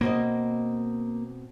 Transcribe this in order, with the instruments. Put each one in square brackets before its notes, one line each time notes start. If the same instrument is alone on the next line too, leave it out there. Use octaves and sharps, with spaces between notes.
[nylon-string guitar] B2 C4 D#5 [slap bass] A#3